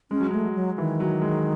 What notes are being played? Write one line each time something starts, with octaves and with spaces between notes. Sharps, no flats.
G#3 C#4
F#3
G#3 A3
F#3
F#3
D#3 E3
F#3
G#3